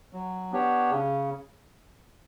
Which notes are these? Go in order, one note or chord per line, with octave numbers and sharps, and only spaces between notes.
F#3
B3 D4 G4 C#5
C#3